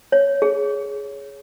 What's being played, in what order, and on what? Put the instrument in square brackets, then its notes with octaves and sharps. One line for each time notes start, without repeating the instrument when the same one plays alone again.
[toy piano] C#5
G#4